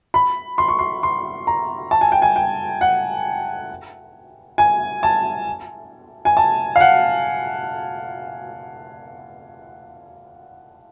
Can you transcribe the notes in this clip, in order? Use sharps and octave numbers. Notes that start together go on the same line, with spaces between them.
B5
C6
C#6
C6
C6
A#5
A5
G#5
G5
G#5
G5
F#5
G#5
A5
G#5
A5
F5
F#5